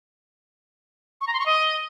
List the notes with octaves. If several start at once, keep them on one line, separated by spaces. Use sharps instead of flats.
C#6
A#5
C6
C#6
D#5